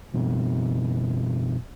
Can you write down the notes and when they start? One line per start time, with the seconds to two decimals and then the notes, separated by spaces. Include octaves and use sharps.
0.14 F#1 B2